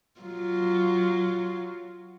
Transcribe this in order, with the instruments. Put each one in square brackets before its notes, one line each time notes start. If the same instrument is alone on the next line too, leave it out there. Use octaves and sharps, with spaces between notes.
[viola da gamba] F#3 F4